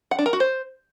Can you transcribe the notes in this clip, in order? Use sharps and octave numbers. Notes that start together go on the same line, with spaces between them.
F#5
D4
A#4
F#4
C5